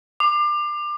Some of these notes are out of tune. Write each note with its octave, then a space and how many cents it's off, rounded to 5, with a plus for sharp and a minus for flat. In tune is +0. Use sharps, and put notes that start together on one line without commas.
D6 +25